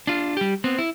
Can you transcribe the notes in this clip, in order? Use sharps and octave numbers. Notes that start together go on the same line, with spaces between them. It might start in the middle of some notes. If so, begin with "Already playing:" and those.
D4 F4
G3 G4
B3 C4
E4